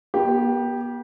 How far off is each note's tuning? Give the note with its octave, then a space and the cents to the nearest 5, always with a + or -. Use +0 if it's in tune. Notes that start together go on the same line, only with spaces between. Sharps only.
B3 -40 G4 +0